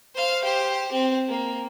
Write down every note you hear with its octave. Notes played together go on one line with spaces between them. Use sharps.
C5 F5
G4 C5
C4
A#3